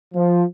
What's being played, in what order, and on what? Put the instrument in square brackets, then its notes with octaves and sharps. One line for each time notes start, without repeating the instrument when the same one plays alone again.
[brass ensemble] F3